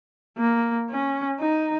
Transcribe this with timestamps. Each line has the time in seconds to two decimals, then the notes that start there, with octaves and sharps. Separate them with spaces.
0.38 A#3
0.89 C#4
1.39 D#4